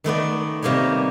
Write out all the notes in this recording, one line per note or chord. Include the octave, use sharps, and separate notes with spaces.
D#3 A3 B3 D5
C3 G3 A#3 D#4 C#5